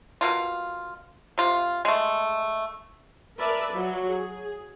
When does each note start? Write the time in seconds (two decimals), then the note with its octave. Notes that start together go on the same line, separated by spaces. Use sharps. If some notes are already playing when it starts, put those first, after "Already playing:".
0.21 B2 A#3 F4
1.38 C3 F4
1.85 G#3 A3
3.38 A#4 B4 D5 E5 A5
3.73 F#3
4.07 G#4